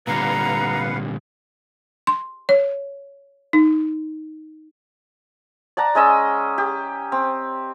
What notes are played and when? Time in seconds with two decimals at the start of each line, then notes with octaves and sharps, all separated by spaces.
0.07 A#2 D3 G3 B4 F5 F#5 A#5
2.07 C6
2.49 C#5
3.53 D#4
5.77 D5 F#5 A5 A#5
5.95 G#3 C#4 D#5 E6
6.58 G4
7.12 C4